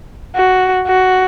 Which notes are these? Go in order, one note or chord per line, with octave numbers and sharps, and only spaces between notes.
F#4
F#4